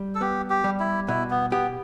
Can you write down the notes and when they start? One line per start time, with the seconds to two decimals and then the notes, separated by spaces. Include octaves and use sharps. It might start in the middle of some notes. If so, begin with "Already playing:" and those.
Already playing: G3
0.15 A4
0.21 B3 G4
0.50 G4
0.64 G3
0.80 E4
1.08 B2 E4
1.31 B3
1.52 B3 G4